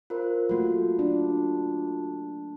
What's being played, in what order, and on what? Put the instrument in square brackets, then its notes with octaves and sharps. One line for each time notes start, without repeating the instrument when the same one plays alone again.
[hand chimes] F4 A#4 C5
[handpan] F#3 A3 A#3 [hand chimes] F4 F#4
[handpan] D4